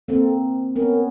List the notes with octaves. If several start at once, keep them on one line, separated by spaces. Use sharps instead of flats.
A#3 C4 A4
B3 C#4 A#4